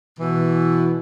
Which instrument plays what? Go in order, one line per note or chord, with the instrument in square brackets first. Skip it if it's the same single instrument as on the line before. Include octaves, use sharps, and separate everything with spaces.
[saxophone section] B2 E3